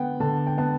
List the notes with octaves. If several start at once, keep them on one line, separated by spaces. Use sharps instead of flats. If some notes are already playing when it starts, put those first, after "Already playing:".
Already playing: D3 B3 F#5 G5
D3 A5
G5
B3 A5